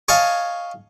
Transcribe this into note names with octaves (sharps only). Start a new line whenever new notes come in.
C#5 D#5 F5 G#5 A5